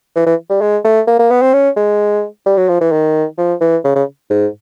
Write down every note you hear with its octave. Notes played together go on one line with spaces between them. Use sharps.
E3
E3
G3
G#3
A3
A#3
A#3
B3
C4
C#4
G#3
G3
F#3
F3
E3
D#3
F3
E3
C#3
C#3
G#2